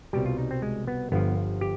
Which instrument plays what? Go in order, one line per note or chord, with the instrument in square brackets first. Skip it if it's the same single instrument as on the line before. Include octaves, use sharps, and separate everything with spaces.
[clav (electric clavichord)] C2 B2 G3 G4
F4
D#4
C4
G#3
B3
G1 G2 F3 B3
G4